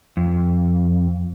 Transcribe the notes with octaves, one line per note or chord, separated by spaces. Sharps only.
F2